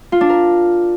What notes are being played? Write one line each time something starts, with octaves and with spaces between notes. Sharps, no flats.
F4
D4
A#4